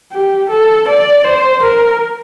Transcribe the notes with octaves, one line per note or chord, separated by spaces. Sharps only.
G4
A4
D5
C5
A#4